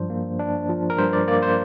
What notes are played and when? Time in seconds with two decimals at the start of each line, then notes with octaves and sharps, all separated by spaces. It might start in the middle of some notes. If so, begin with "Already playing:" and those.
Already playing: G2 F3 D4 C5
0.10 A#3
0.40 D4
0.69 F3
0.90 A#4
0.98 G2 C5
1.13 D5
1.28 A#3 D5
1.42 C5